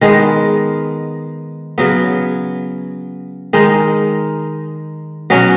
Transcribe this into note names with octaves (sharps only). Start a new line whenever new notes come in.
D#3 G#3 B3
C#3 F#3 B3
D#3 G#3 D#4
B2 F#3 C#4